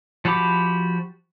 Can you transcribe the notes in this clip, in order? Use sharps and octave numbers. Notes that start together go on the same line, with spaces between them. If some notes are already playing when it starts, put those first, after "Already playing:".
F3 F#4 G4 B5 D6